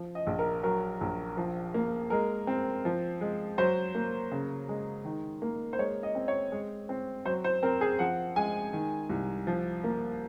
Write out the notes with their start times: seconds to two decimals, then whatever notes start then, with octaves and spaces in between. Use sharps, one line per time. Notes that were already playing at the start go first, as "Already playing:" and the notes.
Already playing: F3
0.15 D#5
0.27 A#1
0.39 A#4
0.63 F#3 A#4
1.01 A#1
1.37 F3
1.74 A#3
2.10 G#3 A#4
2.47 C4
2.85 F3
3.21 G#3
3.58 F#3 C5
3.95 A#3
4.32 C#3
4.69 G#3
5.05 D#3
5.42 A#3
5.73 C5
5.79 G#3 C#5
6.03 D#5
6.15 C4
6.28 C#5
6.52 G#3
6.89 C4
7.25 F#3 C5
7.44 C5
7.63 C4 A#4
7.81 G#4
7.99 F3 F#5
8.36 G#3 G#5
8.73 D#3
9.10 C2
9.47 F3
9.84 A#3